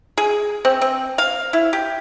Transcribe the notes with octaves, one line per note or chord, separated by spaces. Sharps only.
G#4
C4
C4
F5
E4
G4